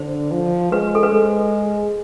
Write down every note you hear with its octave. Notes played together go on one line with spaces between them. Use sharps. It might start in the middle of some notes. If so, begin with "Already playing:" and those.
Already playing: D3 C5
F3
G#3 B4
A4
B4
G#3 C5